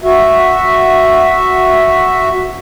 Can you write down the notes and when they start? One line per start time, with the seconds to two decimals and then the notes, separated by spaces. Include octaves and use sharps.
0.04 F#4 E5